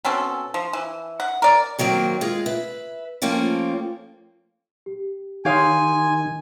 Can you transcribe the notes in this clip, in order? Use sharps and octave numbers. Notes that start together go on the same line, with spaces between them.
B2 C4 C#4 A4
F3
E3
F#5
A#4 D5
D#3 F#3 A#3 C4
G#3 F4 G#4
B4 E5
F3 A3 A#3 C4 C#4 F4
G4
D#3 G4 C#5 F5 G#5 C6 D#6 G#6